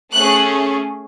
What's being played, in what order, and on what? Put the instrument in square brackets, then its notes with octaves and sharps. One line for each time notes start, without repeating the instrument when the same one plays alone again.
[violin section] A3 C#4 G#4 F#6